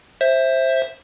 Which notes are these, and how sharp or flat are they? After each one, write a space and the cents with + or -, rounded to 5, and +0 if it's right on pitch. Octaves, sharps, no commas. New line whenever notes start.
C5 +15 E5 +0